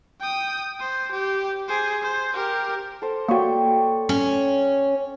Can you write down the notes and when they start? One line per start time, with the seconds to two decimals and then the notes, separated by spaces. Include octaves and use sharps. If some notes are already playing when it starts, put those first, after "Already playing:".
0.20 G5 D#6
0.80 C5
1.11 G4
1.68 G#4 C5
2.03 C5
2.33 G4 A#4
3.02 A4 C5
3.29 A#3 F#4 C#5 D5 G5
4.09 C#4